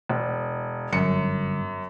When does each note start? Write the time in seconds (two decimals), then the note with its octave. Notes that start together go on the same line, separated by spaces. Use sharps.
0.09 E1
0.93 G1 F#2 C#7